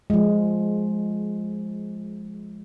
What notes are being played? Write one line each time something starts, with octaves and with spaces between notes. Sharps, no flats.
F3 G#3